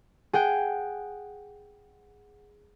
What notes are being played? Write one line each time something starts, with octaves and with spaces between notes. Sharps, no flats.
G#4 F#5 G5